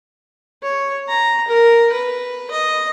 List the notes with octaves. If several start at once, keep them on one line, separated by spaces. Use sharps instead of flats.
C#5
A#5
A#4
B4
D#5